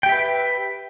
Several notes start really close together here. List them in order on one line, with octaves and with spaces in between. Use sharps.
G5 G4 E5 B4